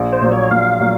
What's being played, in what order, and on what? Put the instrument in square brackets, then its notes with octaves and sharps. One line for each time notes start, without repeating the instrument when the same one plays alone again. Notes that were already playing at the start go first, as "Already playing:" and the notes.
Already playing: [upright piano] A#1
[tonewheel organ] C5
[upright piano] A#2 F#3
[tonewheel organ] C#5
[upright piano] A#1 [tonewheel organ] F5
[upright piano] A#2 F#3